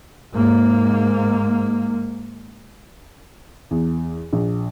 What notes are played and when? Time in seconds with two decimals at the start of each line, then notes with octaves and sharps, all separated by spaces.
0.33 G#2 A#3
3.71 E2
4.33 A#1